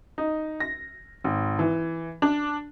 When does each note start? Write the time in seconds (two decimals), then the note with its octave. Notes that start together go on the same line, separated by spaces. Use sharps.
0.18 D#4
0.60 A#6
1.24 G#1
1.59 E3
2.22 D4